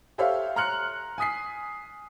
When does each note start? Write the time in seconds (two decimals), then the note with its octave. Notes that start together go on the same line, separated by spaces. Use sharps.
0.18 G4 A4 C5 C#5 E5 F5
0.56 A#5 C6 F6 F#6 C#7 F#7
1.18 G#5 D#6 B6 C7